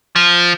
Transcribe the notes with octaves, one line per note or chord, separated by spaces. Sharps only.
F3